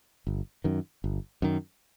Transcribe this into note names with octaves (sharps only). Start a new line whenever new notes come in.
G1
F#2 D#3
G1
F#2 D#3